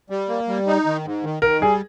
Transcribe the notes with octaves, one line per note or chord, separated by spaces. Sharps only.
G3
A#3
G3
D#4
D#3
G#2
D#3
D#3 A#4
G3 G#4